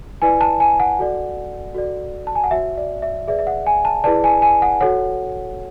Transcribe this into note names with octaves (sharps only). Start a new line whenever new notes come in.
E4 B4 D5 G#5
A5
G#5
F#5
F#4 A4 D5
F#4 A4 D5
A5
G#5
F#5
F#4 C#5 E5
D5
E5
G#4 B4 D5 E5
E5
F#5
G#5
A5
E4 G#4 B4 D5 A5
G#5
G#5
F#5
F#4 A4 C#5 F#5